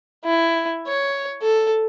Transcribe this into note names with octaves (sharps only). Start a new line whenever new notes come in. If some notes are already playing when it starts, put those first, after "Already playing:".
E4
C#5
A4